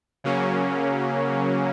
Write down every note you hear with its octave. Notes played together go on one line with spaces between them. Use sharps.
C#3 F#3 A#3 C#4